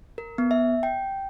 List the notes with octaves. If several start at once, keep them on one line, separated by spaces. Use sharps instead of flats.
A#4
B3
E5
G5